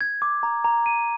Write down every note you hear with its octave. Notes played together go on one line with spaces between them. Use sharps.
G#6
D6
A#5
A#5
D#7